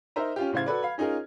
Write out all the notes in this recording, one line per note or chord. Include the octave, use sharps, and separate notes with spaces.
D#4 A#4 C5 E5 A#5
C#4 F4 G4
A2 C#3 C5 F5 G#6
F#4 A4 B4 D5
F5 B5
C#4 D#4 F4 G#4 A#4